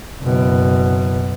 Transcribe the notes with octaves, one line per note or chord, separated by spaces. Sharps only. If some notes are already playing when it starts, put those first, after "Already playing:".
F#1 B2